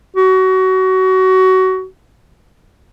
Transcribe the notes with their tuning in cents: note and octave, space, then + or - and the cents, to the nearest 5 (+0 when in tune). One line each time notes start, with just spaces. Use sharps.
F#4 +25